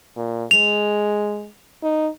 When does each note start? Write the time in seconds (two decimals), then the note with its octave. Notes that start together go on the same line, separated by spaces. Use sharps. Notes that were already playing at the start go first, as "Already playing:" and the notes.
0.16 A#2
0.51 G#3 F7
1.83 D#4